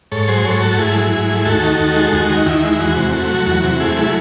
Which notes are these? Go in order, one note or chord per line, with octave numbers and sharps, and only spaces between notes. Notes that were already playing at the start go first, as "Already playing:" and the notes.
G#2 A4 C#5
F#3 G#4 C5
G#2 A4 C#5
A3 F#4 A4
G#2 E4 G#4
F#3
G#2
A3
D#2 F#4 A4
D#3
D#2
G#3
D#2 F#4
D#3
D#2 E4
G#3
E2 F#4
C3
A3
F#3
E2 F#4
C3 F#4
A3 E4 G#4
F#3 E4 G#4